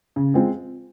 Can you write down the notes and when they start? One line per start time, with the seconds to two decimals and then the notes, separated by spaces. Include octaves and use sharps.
0.16 C#3
0.34 G#3 C4 F4